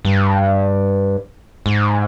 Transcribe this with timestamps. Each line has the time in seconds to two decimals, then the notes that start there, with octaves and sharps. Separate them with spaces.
0.05 G2
1.66 G#2